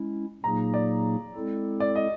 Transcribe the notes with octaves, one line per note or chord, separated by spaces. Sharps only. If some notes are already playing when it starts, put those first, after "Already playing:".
Already playing: G#3 C#4 E4
A#2 F#3 A#3 D#4 G#4 A#5
D5
G#3 C4 E4 A4
D5
D#5